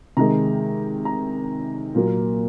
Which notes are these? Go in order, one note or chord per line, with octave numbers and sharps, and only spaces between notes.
C3 D#3 G#3 A#5
A#5
A#2 F#3 A#3